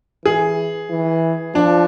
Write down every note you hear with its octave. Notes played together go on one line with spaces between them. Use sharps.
E3 G#4
E3
F3 D4